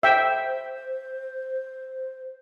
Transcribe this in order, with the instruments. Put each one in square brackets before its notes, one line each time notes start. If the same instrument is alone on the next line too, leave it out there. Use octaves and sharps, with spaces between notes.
[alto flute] C5 [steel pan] E5 G5